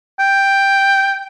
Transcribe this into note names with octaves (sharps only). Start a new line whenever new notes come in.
G5